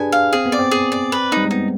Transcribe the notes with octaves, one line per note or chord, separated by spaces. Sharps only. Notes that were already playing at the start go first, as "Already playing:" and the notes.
Already playing: D4 G4 G#4 B4 G#5
F5
C4 G#4
B3
D5
C4
G#4
D5
B4
D#4
G3
G#3
B3 D#4